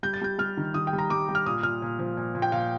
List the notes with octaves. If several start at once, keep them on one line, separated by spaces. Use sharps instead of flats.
G3 G6
A6
G3 G6
G3 F6
D#3
D#3 D#6
G5
G3
A#5
G3 D6
G3
F6
A#2 D#6
A#2 F6
A#2
F3
A#2
A#2
G5
A#2 F5